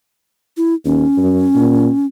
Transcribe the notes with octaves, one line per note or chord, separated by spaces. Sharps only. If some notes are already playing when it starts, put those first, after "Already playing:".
E4
D#2 C#4
F#2
A#2